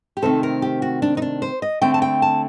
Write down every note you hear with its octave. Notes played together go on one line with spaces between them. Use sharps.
G4
C3 D#3 A3 C4 A4
A#4
G4
F#4
D4
D#4
D4
C5
D#5
D3 A3 C4 G5
A5
G5
A5